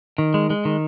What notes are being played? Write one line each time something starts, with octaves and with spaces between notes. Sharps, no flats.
D#3
G#3
G#3
D#3